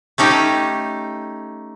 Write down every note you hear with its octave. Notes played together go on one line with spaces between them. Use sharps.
A3 C#4 D#4 G4